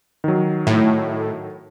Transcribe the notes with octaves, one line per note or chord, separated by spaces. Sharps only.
D#3 F#3
A2